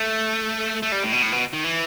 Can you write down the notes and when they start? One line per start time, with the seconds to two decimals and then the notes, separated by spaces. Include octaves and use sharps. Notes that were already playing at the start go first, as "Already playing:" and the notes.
Already playing: A3
0.83 A3
0.92 G3
1.03 A2
1.13 B2
1.23 A2
1.33 B2
1.53 D#3
1.64 E3